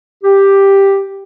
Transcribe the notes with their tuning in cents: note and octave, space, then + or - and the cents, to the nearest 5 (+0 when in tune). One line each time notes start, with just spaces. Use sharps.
G4 +5